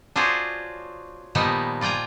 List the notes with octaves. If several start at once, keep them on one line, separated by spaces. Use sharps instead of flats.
D4 F4 F#4 G#4 C5 C#5
A#2 D#3 F3 G3 B3 D#4
F4 D5 G5 G#5 A#5